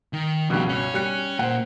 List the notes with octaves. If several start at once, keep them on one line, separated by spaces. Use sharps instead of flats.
D#3
C#2 G2 B2 F3 G4
C#4 C#5
G3 F#6 C#7
A#2 A#3 C5 F#5